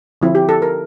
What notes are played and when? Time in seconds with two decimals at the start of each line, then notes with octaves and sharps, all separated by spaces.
0.22 D3 F3 C4 E4
0.35 G4
0.49 A4
0.62 A#4